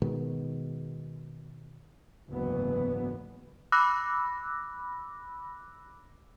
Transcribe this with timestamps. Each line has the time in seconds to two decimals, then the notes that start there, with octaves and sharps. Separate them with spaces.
0.02 B2 D#3 G#3 B3
2.28 F#1 D2 G#2 E3 F#3 B3
3.72 B5 D6 E6 F#6 A#6